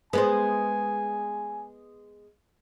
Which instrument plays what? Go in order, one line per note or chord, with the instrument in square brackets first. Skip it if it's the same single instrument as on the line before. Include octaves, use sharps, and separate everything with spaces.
[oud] G#3 B3 [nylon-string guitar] B4 C5 [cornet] G#5